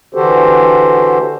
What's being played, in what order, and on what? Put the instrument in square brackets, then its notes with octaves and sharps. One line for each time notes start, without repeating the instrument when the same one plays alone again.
[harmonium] D3 E3 F#4 G4 A4 C5